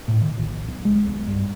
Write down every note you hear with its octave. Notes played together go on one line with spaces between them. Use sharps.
A2
D#3
A#1
B1
G#3
B1
G2